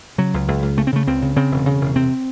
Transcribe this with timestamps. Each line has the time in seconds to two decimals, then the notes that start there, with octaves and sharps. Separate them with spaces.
0.18 C#3 F#3
0.34 C#2
0.48 C#2
0.62 C#2
0.78 C#3 A3
0.87 C4
0.92 C#3 A3
1.07 C#2 C4
1.22 C#3
1.36 C#3 C4
1.51 E1
1.66 C#3
1.81 E1
1.96 C3 C4